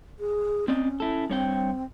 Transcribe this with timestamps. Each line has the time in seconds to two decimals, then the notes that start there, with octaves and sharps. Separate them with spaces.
0.20 G#4
0.68 C4 C#4 D5 D#5
1.00 E4 A4
1.30 G2 C4 C#5 G5